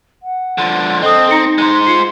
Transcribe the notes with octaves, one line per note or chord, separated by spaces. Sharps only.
F#5
D3 F3
C4 A4 D#5 D#6
D#4 A#5 A#6 C#7
G#3 C5
F4 C7 C#7